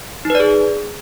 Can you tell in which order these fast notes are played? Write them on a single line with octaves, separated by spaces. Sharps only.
D#4 B4 D5 G#4